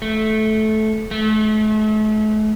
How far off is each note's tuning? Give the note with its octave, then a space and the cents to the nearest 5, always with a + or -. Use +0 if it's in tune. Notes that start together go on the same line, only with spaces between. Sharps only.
A3 -15
A3 -40